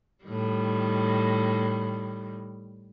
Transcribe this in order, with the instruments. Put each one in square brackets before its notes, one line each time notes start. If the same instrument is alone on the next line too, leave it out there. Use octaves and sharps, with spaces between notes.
[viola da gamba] A2 D#3 G3